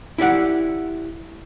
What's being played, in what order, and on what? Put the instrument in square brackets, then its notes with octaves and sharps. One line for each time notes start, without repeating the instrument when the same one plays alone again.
[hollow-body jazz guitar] E4 G4 D5 F#5